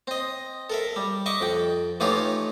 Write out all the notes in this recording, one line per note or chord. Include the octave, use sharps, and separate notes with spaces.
C4 D#5
A4 A#4 E5
G3
D#5 E5 C#6 D6
F2 G5
E3 A3 D#4 F4 G4 C#5